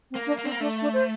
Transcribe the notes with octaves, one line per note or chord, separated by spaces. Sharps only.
C4
A#3
D4
A#3
C4 D4
A#3
A3 D4
D4
C5